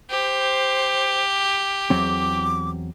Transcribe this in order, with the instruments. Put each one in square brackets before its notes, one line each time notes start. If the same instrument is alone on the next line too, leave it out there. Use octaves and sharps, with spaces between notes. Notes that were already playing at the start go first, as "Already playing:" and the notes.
[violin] G4 [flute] C5
[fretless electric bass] E2 F#3 C4 [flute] D6